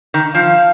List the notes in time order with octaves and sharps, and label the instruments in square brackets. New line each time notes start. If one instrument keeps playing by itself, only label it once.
[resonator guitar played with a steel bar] D#3
[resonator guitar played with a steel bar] F3 [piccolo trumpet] F5